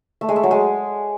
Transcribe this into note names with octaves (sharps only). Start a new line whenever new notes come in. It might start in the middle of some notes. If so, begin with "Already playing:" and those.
A3
G#3
A3
F#3
G#3